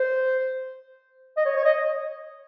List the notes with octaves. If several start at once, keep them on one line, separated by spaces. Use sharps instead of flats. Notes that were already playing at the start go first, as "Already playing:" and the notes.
Already playing: C5
D#5
C#5
C#5
D#5